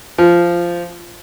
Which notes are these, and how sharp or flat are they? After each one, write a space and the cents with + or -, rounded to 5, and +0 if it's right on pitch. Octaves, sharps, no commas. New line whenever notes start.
F3 -10